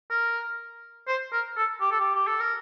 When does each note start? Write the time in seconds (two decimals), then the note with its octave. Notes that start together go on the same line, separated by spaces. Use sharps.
0.10 A#4
1.08 C5
1.33 A#4
1.57 A4
1.81 G4
1.91 A4
2.00 G4
2.15 G4
2.27 A4
2.40 A#4